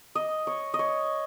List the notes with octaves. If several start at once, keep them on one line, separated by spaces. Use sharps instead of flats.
D#5
C#5
D#5
C#5